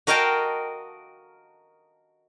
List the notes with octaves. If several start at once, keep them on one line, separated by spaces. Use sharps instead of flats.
F#4 A#4 D#5 F5 G5 A5